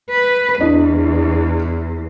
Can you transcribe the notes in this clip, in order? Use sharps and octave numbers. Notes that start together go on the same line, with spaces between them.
B4
E2 D4 E4 D#5